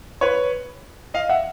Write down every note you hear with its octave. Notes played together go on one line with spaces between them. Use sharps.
B4 C#5
D#5 F5
E5 F#5